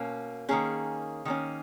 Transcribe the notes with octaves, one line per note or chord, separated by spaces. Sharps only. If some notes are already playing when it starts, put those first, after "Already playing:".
Already playing: B2 A#3 C#4
D#3 A#3 C#4 G#4
D#3 A#3 C#4